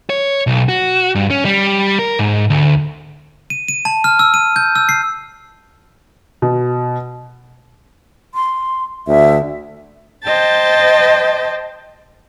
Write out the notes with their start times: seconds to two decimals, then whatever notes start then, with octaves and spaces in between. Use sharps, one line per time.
0.10 C#5
0.47 B1
0.69 F#4
1.15 G2
1.31 C#4
1.45 G3
1.99 A#4
2.19 G#2
2.50 D2
3.50 D#7
3.68 D#7
3.85 A5
4.04 F6
4.19 E6
4.34 D#7
4.56 G6
4.76 E6
4.89 C7
6.42 B2
8.35 C6
9.08 D2 E5
10.23 C5 D#5 G5 A5 A6